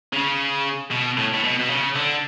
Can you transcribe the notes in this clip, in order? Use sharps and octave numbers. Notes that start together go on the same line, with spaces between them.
C#3
B2
A2
A2
B2
B2
C#3
D3